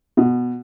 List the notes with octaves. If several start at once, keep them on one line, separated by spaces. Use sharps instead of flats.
B2